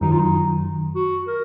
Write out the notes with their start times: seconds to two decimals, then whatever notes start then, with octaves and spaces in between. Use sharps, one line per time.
0.01 F#2 D#3 F#3 D#4
0.11 F4
0.19 D#4
0.95 F#4
1.27 A#4